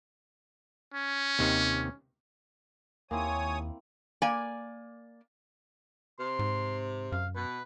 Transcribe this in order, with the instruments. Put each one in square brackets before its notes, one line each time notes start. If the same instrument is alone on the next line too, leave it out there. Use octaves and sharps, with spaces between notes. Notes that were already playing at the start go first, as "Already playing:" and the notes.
[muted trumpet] C#4
[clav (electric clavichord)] D#2 C3 D#3
[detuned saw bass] D#2 [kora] A#3 C4 E4 [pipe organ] C#5 D#6 [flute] G#5
[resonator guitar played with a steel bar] A#3 D5 G#5
[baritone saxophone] C3 [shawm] C6
[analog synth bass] G#2
[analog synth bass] F#2 [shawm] F5
[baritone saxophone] B2 [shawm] B4